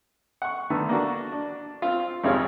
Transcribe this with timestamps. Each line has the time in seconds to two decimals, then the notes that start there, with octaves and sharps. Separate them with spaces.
0.42 F#5 C#6
0.70 D3 D#3 A3 B3
0.89 A#3 D4 F#4
1.32 D4
1.82 C4 F4
2.24 G#1 F2 C3 G#4 C#5 F5